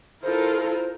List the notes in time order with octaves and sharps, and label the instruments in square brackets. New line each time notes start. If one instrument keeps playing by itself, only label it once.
[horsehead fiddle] E4 A4 [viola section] F4 A#4 [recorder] C5